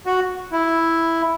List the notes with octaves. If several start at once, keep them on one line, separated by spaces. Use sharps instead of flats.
F#4
E4